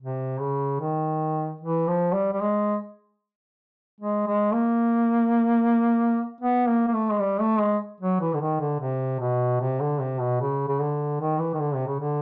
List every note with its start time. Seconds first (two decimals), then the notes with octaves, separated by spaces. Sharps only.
0.01 C3
0.40 C#3
0.80 D#3
1.61 E3
1.88 F3
2.13 G3
2.32 G3
2.41 G#3
4.01 G#3
4.27 G#3
4.53 A#3
6.41 B3
6.67 A#3
6.88 A#3
6.93 A3
7.10 G#3
7.20 G3
7.40 A3
7.60 G#3
8.01 F#3
8.21 E3
8.34 D3
8.41 D#3
8.60 D3
8.80 C3
9.20 B2
9.60 C3
9.80 D3
10.00 C3
10.20 B2
10.41 C#3
10.68 C#3
10.80 D3
11.21 D#3
11.39 E3
11.54 D#3
11.60 D3
11.75 C3
11.87 C#3
12.00 D3